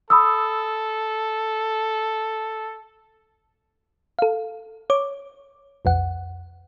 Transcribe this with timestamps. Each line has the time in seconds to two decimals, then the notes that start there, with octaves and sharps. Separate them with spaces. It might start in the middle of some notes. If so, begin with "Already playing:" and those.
0.10 A4 B5 D#6 E6
4.19 A4 F5
4.90 C#5 D6
5.85 B1 F2 F#5